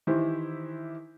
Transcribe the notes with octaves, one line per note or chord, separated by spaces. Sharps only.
D#3 E3 E4 G4 C5